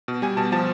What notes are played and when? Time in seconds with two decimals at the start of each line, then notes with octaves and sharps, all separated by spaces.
0.08 B2
0.22 G3 G#5
0.37 B2 A5
0.52 F3 A5